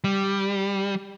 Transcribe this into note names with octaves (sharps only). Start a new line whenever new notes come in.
G3